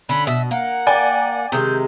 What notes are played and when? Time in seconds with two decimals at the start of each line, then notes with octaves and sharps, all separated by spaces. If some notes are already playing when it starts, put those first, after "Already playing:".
0.09 D3 C#4 B5
0.27 B2 E5
0.51 A#3 F#5
0.87 D5 G5 G#5
1.52 C3 D#3 G#3 G6